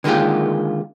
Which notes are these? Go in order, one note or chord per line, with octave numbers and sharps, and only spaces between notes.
D3 D#3 G#3 A#3 F4 G4